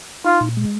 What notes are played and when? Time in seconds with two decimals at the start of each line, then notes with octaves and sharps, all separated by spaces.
0.24 D#4 F4
0.41 A#2
0.57 G#3